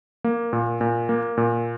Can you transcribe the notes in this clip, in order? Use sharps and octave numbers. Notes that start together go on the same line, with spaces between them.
A#3
A#2
A#2
A#3
A#2